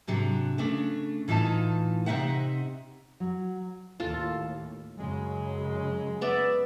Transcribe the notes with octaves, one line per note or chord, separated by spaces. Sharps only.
G#2 C3 F#3 D4
C#3 A3 D4
A2 E3 D#4 F4 A5
C3 C4 D#4 E5 F#5
F#3
D#2 A2 F4 A4
F#2 C#3 F#3 G#3
B3 D5 E5